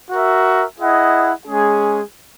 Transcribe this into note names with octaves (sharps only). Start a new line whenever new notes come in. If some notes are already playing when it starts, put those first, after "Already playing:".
F#4 A#4 E5
E4 G#4 D#5 F#5
G#3 C#4 G#4